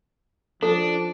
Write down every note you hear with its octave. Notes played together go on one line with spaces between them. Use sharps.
F3 D4 A4